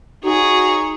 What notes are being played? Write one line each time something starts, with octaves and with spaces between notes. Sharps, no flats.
D#4 F#4 G#4 C#5